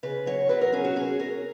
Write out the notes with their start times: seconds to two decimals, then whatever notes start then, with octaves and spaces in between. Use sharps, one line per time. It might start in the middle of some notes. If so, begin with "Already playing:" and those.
0.03 C#3 B4
0.26 F#3 C#5
0.49 F#3 B4
0.61 A#4
0.72 C#4 G#4
0.84 F#4
0.96 C#4 G#4
1.19 C#4 A#4